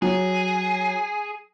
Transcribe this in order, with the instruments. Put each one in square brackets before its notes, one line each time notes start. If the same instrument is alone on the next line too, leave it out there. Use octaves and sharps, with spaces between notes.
[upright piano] F#3 [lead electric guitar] G#4